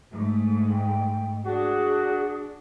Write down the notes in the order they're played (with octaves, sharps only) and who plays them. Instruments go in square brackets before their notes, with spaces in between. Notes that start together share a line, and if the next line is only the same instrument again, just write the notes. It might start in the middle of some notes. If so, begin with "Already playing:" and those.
[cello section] G#2 A3
[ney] G5
[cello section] D4 [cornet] F#4 [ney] G#4